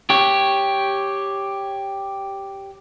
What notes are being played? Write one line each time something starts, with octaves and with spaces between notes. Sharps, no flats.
G4 C#5